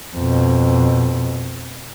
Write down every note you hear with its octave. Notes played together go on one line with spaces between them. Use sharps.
F2 B2